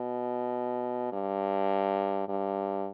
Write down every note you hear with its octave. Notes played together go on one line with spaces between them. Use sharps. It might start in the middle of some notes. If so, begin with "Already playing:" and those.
Already playing: B2
G2
G2